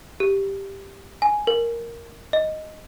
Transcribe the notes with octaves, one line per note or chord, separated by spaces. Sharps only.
G4
G#5
A#4
D#5